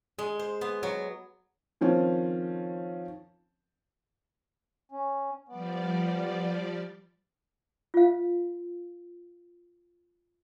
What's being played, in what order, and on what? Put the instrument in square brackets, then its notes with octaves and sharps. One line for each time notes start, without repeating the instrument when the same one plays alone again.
[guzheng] G#3
C5
B3
F#3
[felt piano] D#3 F3 C4 C#4
[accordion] C#4
[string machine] F3 G3 D5 [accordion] B3
[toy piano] F4 F5